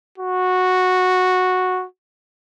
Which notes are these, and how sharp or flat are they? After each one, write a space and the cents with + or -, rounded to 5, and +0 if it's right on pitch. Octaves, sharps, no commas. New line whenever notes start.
F#4 -10